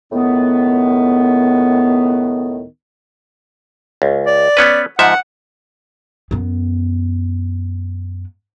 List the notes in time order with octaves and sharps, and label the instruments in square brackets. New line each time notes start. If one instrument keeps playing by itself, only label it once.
[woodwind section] C#2 A2 D#3 B3
[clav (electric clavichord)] C#2
[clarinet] D5
[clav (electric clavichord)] B3 C#4 B4
[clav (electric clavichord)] G#2 F3 E5 [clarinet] F#5
[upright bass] F#2 B3